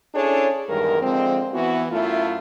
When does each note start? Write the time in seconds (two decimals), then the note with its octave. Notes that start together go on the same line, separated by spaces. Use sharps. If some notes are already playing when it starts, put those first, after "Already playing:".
0.15 C#4 D4 E4 G#4 A4 C#5
0.69 E2 G2 D#3 G#3 A#4
1.01 D3 F3 G#3 C4
1.53 E3 B3 E4 F#4
1.91 F#2 A3 E4 F4